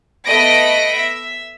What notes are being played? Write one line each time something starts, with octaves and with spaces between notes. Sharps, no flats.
A3 B3 D#5 B5 A#6 D7
E5